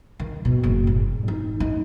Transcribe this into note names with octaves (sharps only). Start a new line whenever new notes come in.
D#3
B2
F#1
G#2
D#4
D#4